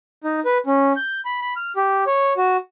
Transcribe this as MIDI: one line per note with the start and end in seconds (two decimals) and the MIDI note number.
0.24 0.40 63
0.45 0.58 71
0.66 0.93 61
0.96 1.20 91
1.25 1.40 83
1.42 1.54 83
1.56 1.72 89
1.76 2.04 67
2.07 2.33 73
2.37 2.57 66